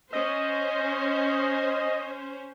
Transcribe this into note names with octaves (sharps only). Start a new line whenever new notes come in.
C#4 C5 D#5